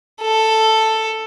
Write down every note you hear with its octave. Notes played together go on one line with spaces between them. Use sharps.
A4